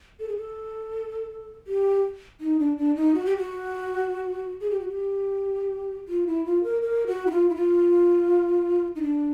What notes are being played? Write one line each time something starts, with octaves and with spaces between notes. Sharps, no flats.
A4
G#4
A4
G4
D#4
D4
D4
D#4
F#4
G4
F#4
G#4
G4
F#4
G4
F4
E4
F4
A#4
A#4
F#4
E4
F4
E4
F4
D#4
D4